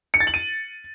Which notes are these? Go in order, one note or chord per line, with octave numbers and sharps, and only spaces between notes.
C#7
A6
F#7
D#7